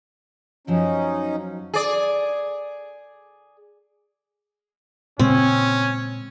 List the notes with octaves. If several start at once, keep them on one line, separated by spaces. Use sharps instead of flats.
F#2 F3 F#3 C#4 D#4
G#4 D5
A#2 C#3 G#3 C4 C#4